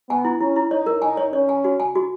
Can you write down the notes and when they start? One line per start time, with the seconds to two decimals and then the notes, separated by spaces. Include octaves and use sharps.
0.09 B3 G#5
0.25 E4
0.41 C#4 E4
0.56 E4
0.71 D#4 C#5
0.86 A#4
1.02 D#4 G#5
1.17 C#5
1.33 C#4 C#5
1.49 G#5
1.64 F#4
1.80 G#5
1.95 F#4